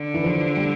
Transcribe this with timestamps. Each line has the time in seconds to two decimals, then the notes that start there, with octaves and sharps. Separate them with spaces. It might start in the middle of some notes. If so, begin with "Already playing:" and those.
Already playing: D3
0.14 E3
0.24 F3
0.57 G3